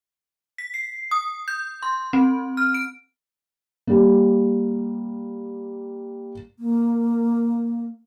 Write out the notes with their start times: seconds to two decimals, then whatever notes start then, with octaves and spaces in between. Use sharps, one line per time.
0.58 B6
0.74 C7
1.11 D#6
1.48 G6
1.83 C6
2.13 C4
2.57 F6
2.74 D7
3.87 G3 A#3
6.59 A#3